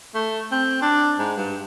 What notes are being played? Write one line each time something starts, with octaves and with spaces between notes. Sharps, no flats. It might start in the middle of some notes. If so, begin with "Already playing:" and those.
A3
C4
D4
G#2
G2